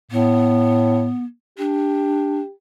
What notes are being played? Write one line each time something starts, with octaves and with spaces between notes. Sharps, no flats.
A2 B3
D4 G4